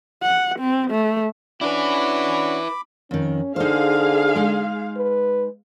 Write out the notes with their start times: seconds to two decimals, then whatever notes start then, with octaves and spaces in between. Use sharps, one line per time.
0.23 F#5
0.60 C4
0.91 A3
1.61 C#4 D4 E4 F#4 B4 B5 D6
3.11 F2 D#3 C#4
3.56 D3 D#4 G#4 C5 F5
4.35 G#3 D#4
4.96 B4